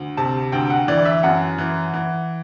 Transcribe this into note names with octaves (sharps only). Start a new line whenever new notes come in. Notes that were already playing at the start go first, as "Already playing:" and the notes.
Already playing: D2
C3 A5
D2 G5
F#5
E3 D5
E5
F#2 F#5
E3
E3